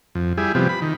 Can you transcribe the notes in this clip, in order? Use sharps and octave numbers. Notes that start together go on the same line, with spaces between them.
F2
G3 E4 G#4
C3 F3 G3 B3
B5
D#3